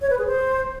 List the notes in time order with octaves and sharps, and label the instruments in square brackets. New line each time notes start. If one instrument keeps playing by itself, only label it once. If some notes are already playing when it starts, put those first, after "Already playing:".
[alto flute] C#5
B4
G#4
C5